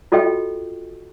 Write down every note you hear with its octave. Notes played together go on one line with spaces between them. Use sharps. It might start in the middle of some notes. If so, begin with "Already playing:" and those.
F4 F#4 A4 D#5 G5